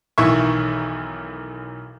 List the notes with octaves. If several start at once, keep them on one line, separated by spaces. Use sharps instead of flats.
B1 D#3 E3 E5 C#6